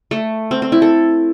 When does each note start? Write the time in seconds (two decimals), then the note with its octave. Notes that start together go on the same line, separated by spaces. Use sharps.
0.11 A3
0.51 C4
0.62 C4
0.72 E4
0.82 A4